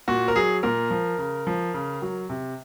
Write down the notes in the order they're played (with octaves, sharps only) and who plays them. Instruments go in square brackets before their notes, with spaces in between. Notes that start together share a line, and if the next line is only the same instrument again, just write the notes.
[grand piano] A#2 F#4
A#4
F#3 G#4
A#2 A#4
F3
C#3
F3
C#3
F#3
C3